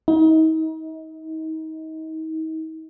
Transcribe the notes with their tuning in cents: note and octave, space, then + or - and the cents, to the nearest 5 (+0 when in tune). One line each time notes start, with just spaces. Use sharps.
D#4 +35